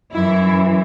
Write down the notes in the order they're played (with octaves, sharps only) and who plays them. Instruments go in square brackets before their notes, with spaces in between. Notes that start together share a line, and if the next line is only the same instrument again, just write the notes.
[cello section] F#2 E3 E4